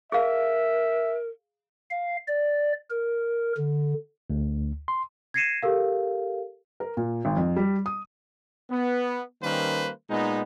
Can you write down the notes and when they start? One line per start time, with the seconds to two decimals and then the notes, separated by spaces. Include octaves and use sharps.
0.12 G#4 A#4 E5 F5
1.91 F5
2.28 D5
2.90 A#4
3.57 D3
4.30 D2
4.88 C6
5.34 G#6 A#6 C7 C#7 D#7 E7
5.63 G4 A4 A#4 F5
6.80 A#4
6.97 A#2
7.25 G#1
7.37 F2
7.56 G3
7.86 D#6
8.71 B3
9.43 D#3 G3 A#3 C#4 B4 C5
10.10 A#2 G#3 B3 D#4